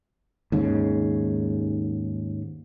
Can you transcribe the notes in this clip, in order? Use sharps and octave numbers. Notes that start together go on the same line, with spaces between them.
D#2 G#2 C#3